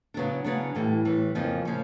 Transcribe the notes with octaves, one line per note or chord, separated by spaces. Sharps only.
C#3 F#3 B3 D4
C#3 F#3 B3 D4
A2 E3 G3
A2 E3 G3
F2 C#3 F3 A#3 C#4
C#3 F3 A#3 C#4